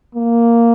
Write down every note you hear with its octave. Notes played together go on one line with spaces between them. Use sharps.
A#3